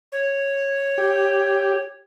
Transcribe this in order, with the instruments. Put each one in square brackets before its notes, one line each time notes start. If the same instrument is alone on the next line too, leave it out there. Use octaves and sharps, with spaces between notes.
[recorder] C#5
[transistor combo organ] G4